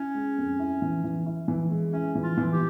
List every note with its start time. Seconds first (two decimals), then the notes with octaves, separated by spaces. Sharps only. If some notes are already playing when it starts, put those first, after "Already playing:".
Already playing: C#4 E4
0.15 G#3
0.38 F2
0.60 E4
0.82 E3
1.04 E3
1.26 E4
1.48 E3
1.70 G#3
1.93 C#4 E4
2.15 E3
2.23 F4
2.37 E3
2.53 G4